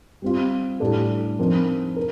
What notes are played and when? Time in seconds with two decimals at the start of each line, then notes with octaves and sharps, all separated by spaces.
0.22 G3 C4 F4
0.80 A2 G3 D4 A4
1.39 F3 C4 D#4 A#4
1.96 A#4